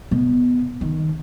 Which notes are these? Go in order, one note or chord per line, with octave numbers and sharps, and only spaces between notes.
B2
D#3